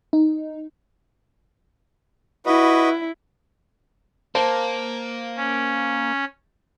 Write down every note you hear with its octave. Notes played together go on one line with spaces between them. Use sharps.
D#4
E4 F#4 B4 D#5
A#3 C5 A5
C#4